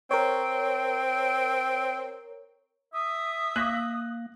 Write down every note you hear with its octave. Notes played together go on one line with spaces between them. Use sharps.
C4 A#4 C#5
E5 D#6
A#3 F#6 A#6